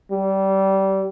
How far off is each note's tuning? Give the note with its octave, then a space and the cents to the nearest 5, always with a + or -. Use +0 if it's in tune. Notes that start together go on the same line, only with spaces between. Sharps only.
G3 -25